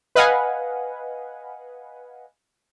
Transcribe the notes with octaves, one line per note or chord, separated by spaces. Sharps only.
B4 D#5 F5 F#5 G#5